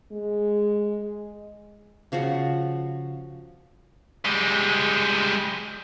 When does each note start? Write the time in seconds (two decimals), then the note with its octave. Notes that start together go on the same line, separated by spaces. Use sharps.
0.12 G#3
2.12 C#3 F3 F#4 F#5
4.25 G3 G#3